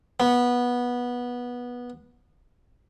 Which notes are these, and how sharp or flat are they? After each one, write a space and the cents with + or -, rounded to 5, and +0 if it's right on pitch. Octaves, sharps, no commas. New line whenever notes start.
B3 -15